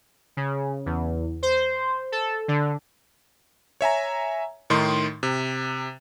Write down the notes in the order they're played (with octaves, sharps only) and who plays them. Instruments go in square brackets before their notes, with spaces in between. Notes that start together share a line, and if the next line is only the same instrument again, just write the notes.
[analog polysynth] C#3
E2
C5
A4
D3
[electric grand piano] C#5 E5 G#5 A#5
A2 D#3 D#4 C6
C3